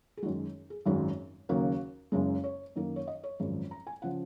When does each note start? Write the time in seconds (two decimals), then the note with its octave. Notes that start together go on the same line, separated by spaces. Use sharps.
0.17 G#4
0.22 F#2 D#3 G#3 F#4
0.70 G#4
0.85 G#1 F#2 D#3 G#3 F#4
1.49 D#2 C#3 F#3 A#3 F#4
2.12 F#1 F#2 C#3 G#3
2.44 C#5
2.76 F#2 D#3 A#3
2.96 C#5
3.08 D#5
3.24 C#5
3.39 G#1 F#2 F3 G#3
3.71 A#5
3.87 G#5
4.02 C#3 F3 F#5